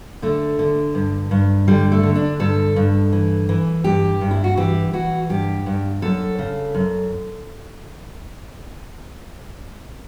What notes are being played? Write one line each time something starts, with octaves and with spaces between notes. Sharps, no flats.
D3 A3
D3
G2
G2
D3 G3
A3
D3
D4
G2 A4
G2
E3
E3
G2 G4
G2
E4
F#4
E3 G4
E3 F#4
G2 G4
G2
F#2 A4
C#3
F#2